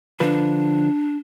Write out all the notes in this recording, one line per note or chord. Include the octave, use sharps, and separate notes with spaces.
D3 F3 D4 B4